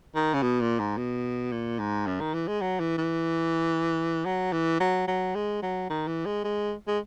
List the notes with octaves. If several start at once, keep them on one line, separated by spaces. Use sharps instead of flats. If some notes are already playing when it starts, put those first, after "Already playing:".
D#3
C#3
B2
A#2
G#2
B2
A#2
G#2
F#2
D#3
E3
G#3
F#3
E3
E3
F#3
E3
F#3
F#3
G#3
F#3
D#3
E3
G#3
G#3
G#3